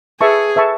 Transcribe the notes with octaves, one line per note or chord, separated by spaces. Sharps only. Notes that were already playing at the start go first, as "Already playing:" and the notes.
G#4 B4 E5 A5 C#6
B4 E5 A5 C#6